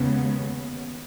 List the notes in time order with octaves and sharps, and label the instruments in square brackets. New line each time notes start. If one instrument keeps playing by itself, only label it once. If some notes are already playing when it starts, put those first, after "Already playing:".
Already playing: [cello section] D#2 C#3 G#3 B3